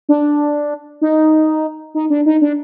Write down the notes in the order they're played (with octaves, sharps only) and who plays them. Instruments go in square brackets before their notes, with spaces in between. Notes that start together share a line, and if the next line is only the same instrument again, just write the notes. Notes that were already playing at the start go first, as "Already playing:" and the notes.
[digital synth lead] D4
D#4
D#4
D4
D#4
D4